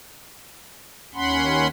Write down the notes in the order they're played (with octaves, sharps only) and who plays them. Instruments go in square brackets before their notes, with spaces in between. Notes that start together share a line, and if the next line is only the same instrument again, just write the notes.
[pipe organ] D#2 C#4 F#5 B5 C6